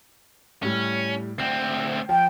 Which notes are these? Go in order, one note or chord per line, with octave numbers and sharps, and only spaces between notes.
A2 G3 C#4
D2 C4 C7
F3 G5